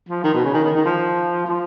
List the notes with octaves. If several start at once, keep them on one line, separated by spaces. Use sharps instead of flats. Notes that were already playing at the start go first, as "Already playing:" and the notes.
F3
D#3
B2
C#3
D#3
D#3
D#3
F3
F3